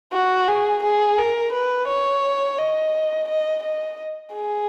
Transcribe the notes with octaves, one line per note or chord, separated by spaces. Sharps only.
F#4
G#4
G#4
A#4
B4
C#5
D#5
D#5
D#5
G#4